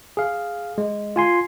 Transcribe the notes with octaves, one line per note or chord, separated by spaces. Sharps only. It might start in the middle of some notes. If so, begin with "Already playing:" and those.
G#4 F5
G#3
F4 G#5 C6